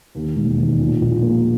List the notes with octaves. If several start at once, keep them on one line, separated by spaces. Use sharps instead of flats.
D#2
E1
D#3
A#2
A#1
A#3